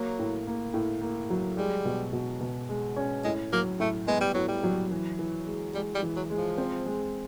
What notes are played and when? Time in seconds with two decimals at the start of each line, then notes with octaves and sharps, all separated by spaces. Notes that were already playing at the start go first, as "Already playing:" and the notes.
Already playing: F#3 A#3
0.19 A2
0.47 A#3
0.74 A2
1.01 A#3
1.30 F#3
1.57 G3 G#3
1.85 B2
2.13 B2
2.41 B2
2.69 G#3
2.97 C#4
3.24 A2 G#3
3.53 F#3 A#3
3.80 A2 A3
4.08 G#3 B3
4.21 G3
4.34 A2 F#3
4.48 G3
4.64 F#3
4.91 E3
5.19 E3
5.47 G#3
5.74 G3 G#3
5.95 G3
6.03 E3
6.16 F#3
6.30 G#3
6.37 F3
6.58 C4
6.86 G#3